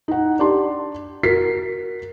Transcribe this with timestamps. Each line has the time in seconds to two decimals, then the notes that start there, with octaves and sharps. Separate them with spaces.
0.08 D#4 F#5
0.39 D4 G4 A5 C6
1.23 F#4 A#4 B6 C7